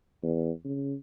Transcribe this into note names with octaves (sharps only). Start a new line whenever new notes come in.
E2
C#3